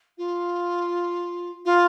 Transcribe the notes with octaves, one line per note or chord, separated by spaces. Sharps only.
F4
F4